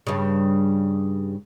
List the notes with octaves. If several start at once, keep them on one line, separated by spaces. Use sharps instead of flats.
G2 C#3